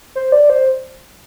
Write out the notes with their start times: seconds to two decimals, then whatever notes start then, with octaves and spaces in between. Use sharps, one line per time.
0.15 C5
0.32 D5
0.50 C5